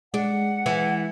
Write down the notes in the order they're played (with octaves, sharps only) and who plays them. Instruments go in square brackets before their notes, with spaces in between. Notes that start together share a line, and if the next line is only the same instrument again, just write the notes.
[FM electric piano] G#3 [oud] D4 [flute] F#5
[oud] E3